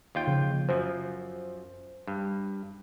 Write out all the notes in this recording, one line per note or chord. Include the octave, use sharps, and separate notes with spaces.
D#2 F4 G5
C#3 F3
F#2 F3 C5
G2